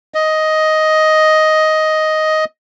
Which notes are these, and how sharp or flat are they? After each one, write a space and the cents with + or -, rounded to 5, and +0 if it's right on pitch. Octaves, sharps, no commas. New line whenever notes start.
D#5 +5